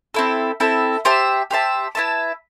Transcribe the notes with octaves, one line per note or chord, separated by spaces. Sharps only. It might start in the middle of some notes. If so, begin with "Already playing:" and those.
C4 E4 A4
C4 E4 A4
G4 C5 E5 A5
G4 C5 E5 A5
E4 B4 E5 A5